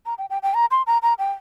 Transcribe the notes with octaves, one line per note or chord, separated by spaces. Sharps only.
A#5
G5
G5
G5
A#5
C6
A#5
A#5
G5